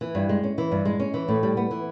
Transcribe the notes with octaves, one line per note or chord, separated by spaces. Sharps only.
E3
G2
G#3
C#4
E3
G2
G#3
C#4
E3
A2
G3
B3
E3